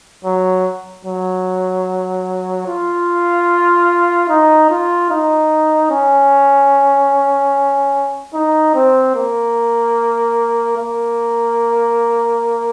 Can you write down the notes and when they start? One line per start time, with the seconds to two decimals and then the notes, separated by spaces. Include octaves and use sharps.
0.24 F#3
1.05 F#3
2.67 F4
4.29 D#4
4.70 F4
5.10 D#4
5.91 C#4
8.34 D#4
8.75 C4
9.15 A#3
10.77 A#3